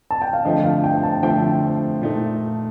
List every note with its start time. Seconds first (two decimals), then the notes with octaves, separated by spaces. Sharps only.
0.11 A5
0.22 G5
0.33 F5
0.45 D3 F3 A3 C4 D#5
0.64 F5
0.84 G5
1.03 A5
1.23 D3 F3 A3 C4 G5
2.01 A#2 A3 D#4